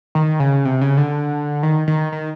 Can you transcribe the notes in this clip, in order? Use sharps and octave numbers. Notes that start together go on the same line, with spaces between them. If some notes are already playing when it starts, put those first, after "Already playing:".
D#3
C#3
C3
C#3
D3
D#3
D#3
D#3